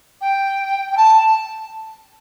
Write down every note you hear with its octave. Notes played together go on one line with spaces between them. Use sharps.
G5
G5
A5